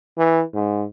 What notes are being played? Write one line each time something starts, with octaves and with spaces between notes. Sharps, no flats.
E3
G#2